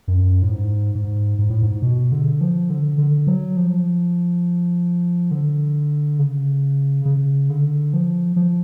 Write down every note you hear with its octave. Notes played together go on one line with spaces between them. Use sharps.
F#2
A2
G#2
G#2
G#2
A2
G#2
B2
D3
F3
D3
D3
F#3
F3
D3
C#3
C#3
D3
F3
F3